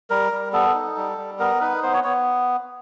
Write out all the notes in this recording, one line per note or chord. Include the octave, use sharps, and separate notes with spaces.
G3 A#4
G3
B3 A4
D#4
G3
G3
B3 A#4
D#4 B4
B3 C5
C#5
B3 C#5